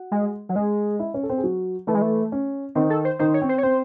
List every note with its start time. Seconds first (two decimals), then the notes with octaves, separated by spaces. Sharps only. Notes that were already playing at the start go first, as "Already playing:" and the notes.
Already playing: F#4 F#5
0.12 G#3
0.49 F#3
0.55 G#3 G#4 G#5
0.99 E4 E5
1.14 C#4 C#5
1.23 A4
1.30 C4 C5
1.38 G#4
1.44 F#3 F#4
1.87 E3 A3 E4
1.95 G#3
2.02 A3
2.32 C#4
2.75 D#3 C4 D#4
2.90 A4
3.05 C5
3.19 D#3 D#4 C5
3.34 C#5
3.42 C4
3.49 C5
3.58 C#5
3.63 C4 C5